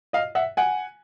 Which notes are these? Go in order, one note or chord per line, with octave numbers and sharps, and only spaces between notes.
D#5 F5
E5 F#5
F#5 G#5